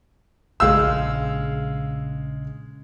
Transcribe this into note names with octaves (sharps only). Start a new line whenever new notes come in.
A#1 C#3 G#3 F5 E6